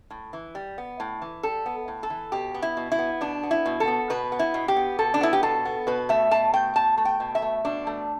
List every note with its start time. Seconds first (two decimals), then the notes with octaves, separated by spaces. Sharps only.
0.10 A2
0.33 E3
0.55 G3
0.78 B3
1.00 A2
1.22 E3
1.43 G3 A4
1.66 B3
1.88 A2
2.03 A4
2.10 E3
2.32 B2 G4
2.54 B3
2.62 E4
2.77 B2
2.92 E4
2.99 B3
3.21 B2 D4
3.43 B3
3.51 E4
3.66 B2
3.80 A4
3.88 B3
4.10 B2 B4
4.32 B3
4.39 E4
4.54 B2
4.68 G4
4.76 B3
4.99 B2 A4
5.14 D4
5.21 B3 E4
5.33 G4
5.43 B2 A4
5.65 B3
5.87 B2 B4
6.09 A3 E5
6.31 B2 A5
6.53 A3 G5
6.76 B2 A5
6.98 A3
7.05 G5
7.20 B2
7.35 E5
7.42 A3
7.65 B2 D4
7.87 A3